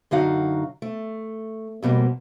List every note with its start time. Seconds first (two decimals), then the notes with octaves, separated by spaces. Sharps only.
0.11 F#2 D3 D#4 F#4 F5
0.82 A3
1.82 F2 B2 G3 A#3